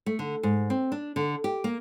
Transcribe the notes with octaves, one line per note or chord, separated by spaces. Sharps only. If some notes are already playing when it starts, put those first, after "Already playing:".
A3
D3
G#2
C4
D4
D3
G4
A#3